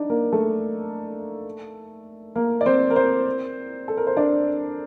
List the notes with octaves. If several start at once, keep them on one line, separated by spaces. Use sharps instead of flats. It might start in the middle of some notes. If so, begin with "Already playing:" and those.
Already playing: D4 D#4 D5
A#3 A#4
A3 A4
A#3 A#4
D5
C4 C5
A#4
C4 C5
A4
A#4
C5
D4 D5